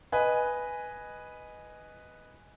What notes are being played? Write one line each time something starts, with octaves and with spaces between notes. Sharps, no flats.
B4 D#5 G#5